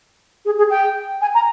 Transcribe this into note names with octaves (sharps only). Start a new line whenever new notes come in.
G#4
G#4
G5
G#5
A#5